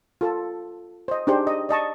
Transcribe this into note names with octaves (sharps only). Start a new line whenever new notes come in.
F4 A4 A5
C5 D#5
D4 D#4 G4 G#4 C5
D#5
D5 D#5 A5 C#6